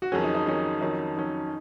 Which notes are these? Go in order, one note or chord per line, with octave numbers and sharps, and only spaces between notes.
F#4
F2 D#3 F#3 C#4 G#4
D#4
D#4
F2 D#3 F#3 C#4
F2 D#3 F#3 C#4 D#4
F2 D#3 F#3 C#4